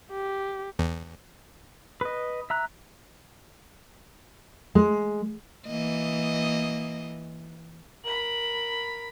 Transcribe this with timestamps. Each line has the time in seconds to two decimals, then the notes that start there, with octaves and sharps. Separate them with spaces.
0.11 G4
0.79 E2
2.01 B4 D#5
2.50 E5 A#5 F#6
4.75 G#3
5.66 E3 A#3 D#5
8.04 A#4 B5 F#7